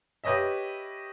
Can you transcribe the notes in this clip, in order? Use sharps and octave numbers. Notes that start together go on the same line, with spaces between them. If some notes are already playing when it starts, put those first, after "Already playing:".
G4 B4 C#5 D#5 E5